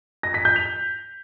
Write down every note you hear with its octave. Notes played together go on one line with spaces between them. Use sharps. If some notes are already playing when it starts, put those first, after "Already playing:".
A#6
B6
G6
F7